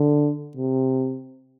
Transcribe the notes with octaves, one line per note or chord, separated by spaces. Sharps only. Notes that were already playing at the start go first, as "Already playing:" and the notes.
Already playing: D3
C3